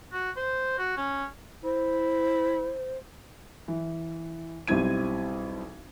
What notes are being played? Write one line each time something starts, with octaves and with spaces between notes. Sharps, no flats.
F#4
C5
F#4
C#4
E4 C5
E3
B1 G3 C4 E4 G#6 D#7